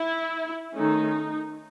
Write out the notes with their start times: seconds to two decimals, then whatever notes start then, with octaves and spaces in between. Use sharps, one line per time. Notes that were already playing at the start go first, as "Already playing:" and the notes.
Already playing: E4
0.75 D#3 A3 C#4 D#4